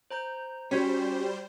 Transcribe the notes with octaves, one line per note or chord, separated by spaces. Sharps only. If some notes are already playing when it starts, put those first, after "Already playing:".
C5 A#5 G6
G3 C#4 F#4 C5 B6